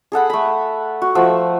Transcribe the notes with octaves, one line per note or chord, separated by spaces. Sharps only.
G#4 A4 F#5 B5
A3 B5
F#4
F3 A3 F#5 E6